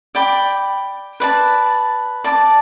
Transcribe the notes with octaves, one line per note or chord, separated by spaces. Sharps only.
D5 G5 B5 D6
B4 D5 A5
D5 A5 D6